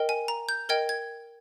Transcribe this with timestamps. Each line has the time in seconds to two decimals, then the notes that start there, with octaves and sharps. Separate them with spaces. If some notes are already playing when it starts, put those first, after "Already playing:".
Already playing: A#4 D#5 G5
0.09 G#5
0.28 A#5
0.49 G6
0.69 A#4 D#5 G5 G#6
0.89 G#6